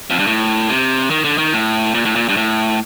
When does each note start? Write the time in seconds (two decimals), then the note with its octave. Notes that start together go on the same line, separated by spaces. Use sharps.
0.10 F2
0.19 G2
0.27 A2
0.69 C3
1.11 D#3
1.24 D3
1.38 D#3
1.53 A2
1.95 A#2
2.05 A2
2.16 A#2
2.29 G2
2.37 A2